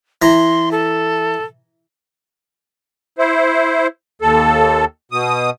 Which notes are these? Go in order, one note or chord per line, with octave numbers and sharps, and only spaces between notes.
E3 A#5 C6
A4
E4 C5
D#2 A4
B2 D#6